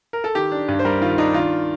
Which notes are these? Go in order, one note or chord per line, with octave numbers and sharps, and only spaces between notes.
A#4
A4
D#3 G4
D4
G2
C5
G3 A#4
D#3 F4
D4 D#4
D#3 F4